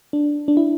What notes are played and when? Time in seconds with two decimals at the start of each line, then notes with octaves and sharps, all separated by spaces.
0.13 D4
0.48 D4
0.57 E4